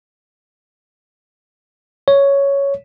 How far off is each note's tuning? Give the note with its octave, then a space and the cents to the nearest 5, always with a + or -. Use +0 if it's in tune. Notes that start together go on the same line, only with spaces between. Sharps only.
C#5 +5